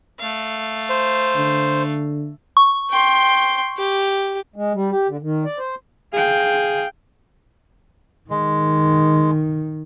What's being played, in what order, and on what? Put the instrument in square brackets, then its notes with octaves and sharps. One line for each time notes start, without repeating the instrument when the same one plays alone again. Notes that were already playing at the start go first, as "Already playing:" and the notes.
[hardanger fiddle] A3 F5
[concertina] C5
[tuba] D3
[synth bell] C#6
[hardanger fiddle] G5 C6
G4
[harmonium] G#3
G3
G4
D3
D#3
D5
C5
[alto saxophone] G#4 [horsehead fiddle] F5 G5
[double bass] D#3 [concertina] G#3